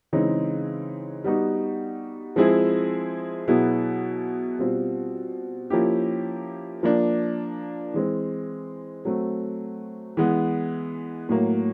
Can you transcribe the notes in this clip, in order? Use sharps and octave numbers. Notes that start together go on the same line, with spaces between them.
C#3 E3 G#3 C4 D#4
G3 B3 D#4 F#4
F3 G#3 C4 E4 G#4
B2 F#3 B3 E4 G#4
B2 G3 C4 F4
F3 A#3 C#4 E4 G4
F3 A#3 D4
E3 G#3 C4
F#3 A3 C4
E3 G#3 B3
A2 F#3 A#3